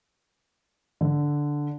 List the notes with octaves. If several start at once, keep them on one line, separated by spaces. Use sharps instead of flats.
D3